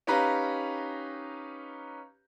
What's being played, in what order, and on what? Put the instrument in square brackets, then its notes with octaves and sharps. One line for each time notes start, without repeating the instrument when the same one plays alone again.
[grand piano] C#4 D#4 G4 B4 F5 A#5